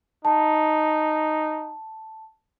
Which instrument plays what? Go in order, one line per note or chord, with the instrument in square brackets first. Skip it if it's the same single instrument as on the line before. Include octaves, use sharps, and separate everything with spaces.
[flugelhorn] D#4 [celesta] A5